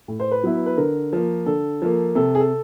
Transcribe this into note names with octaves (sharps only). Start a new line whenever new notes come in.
A2
C5
B4
F#3 B3 E4
B4
D3 A#4
F3 A#3
D3 A4
F3 A#3
C3 A4
G#4
A4